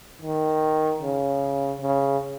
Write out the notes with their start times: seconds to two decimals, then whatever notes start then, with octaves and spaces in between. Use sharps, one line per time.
0.22 D#3
1.02 C#3
1.81 C#3